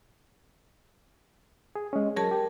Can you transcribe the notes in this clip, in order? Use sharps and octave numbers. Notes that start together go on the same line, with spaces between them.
G#4
G#3 C#4
F#3 G#4 A#4 C#5 A5
G4